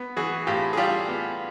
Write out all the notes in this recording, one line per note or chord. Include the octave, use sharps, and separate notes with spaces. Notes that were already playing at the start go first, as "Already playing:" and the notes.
Already playing: B3
E3 F#4 G#4
A2 F4 G4
G#4
G3 F4 G4
B3